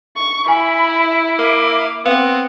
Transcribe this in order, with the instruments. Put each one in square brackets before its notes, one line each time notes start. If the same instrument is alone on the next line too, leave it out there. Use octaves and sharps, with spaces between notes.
[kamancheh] C#6
[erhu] E4 [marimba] G#5 [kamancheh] B5
[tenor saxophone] A#3 [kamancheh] E5 D6
[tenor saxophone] B3 [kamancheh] C4 [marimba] F5